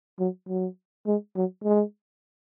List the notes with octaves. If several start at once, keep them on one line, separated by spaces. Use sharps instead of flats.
F#3
F#3
G#3
F#3
G#3